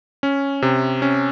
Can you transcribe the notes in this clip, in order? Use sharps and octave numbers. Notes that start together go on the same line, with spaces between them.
C#4
C3
C#4